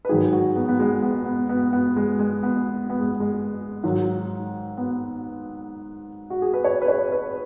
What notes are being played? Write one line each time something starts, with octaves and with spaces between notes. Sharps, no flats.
B4
G#2 D#3 F#3 G#4
F#4
B3
B3
G#3
B3
B3
B3
B3
G#3
G#3
B3
B3
G#3
G#3
G#2 D#3 F#3
B3
F#4
G#4
B4
C#5
B4
C#5
B4